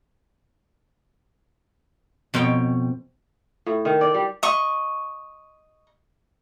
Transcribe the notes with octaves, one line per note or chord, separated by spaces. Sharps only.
F2 B2 C#5 G5
A2
D#3
D5
G3
D#5 C#6